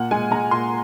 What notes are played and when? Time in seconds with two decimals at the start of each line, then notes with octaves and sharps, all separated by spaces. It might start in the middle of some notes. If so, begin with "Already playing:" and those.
Already playing: A#2 F#5
0.11 G#3 G#5
0.31 G#3 A#5
0.51 A#2 C6